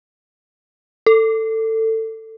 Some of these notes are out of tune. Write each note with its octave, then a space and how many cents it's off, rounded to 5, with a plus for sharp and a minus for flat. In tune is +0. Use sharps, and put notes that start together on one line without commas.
A4 +20